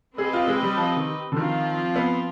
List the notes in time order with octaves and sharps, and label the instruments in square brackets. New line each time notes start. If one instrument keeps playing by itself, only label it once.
[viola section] C4 G4 B4 D#5 [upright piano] G#4
[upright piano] F4
G#3
G3
F3
D#3
D3
[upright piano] D#3 [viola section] F3 C4 F4
[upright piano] B3